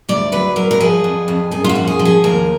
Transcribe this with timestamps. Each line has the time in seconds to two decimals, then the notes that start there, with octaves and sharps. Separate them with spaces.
0.09 D2 D5
0.32 F#3 B4
0.56 F#3 A#4
0.71 A#4
0.80 F3 G#4
1.04 F2
1.28 F2
1.51 F#2 G#4
1.64 F4
1.69 F#4
1.75 F3
1.87 G#4
1.99 F3
2.05 G#4
2.24 D#2 A#4